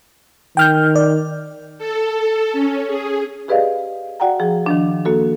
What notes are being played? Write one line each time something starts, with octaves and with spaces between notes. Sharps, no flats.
D#3 G5 F6 G6
D5
A4
C#4
G#4
G4 G#4 B4 D5 D#5 F5
F#4 D5 F#5 G5 A#5
F3 G#4
D#3 F3 D4
A#3 F#4 A4